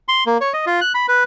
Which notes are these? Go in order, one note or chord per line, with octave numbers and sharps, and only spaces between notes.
C6
A#3
C#5
D#5
F4
F#6
B5
B4